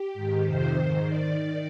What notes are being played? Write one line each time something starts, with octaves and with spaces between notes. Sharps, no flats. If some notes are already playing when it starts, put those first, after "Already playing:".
Already playing: G4
G#2 D#3
F2 C3 D#3 C5
G#2 D#3 C5
D#3 D5